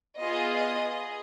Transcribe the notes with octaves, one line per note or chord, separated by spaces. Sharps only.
B3 F4 G#4 D#5
D#5
G#4